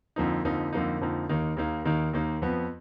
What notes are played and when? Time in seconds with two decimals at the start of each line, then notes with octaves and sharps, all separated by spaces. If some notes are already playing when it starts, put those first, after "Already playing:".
0.16 F2 D3 F3 A#3 D#4
0.45 F2 D3 F3 A#3 D#4
0.73 F2 D3 F3 A#3 D#4
1.01 F2 D3 F3 A#3 D#4
1.29 D#2 D#3 A#3 D#4
1.57 D#2 D#3 A#3 D#4
1.85 D#2 D#3 A#3 D#4
2.13 D#2 D#3 A#3 D#4
2.42 F2 F3 B3